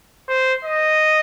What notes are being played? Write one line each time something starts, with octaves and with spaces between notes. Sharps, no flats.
C5
D#5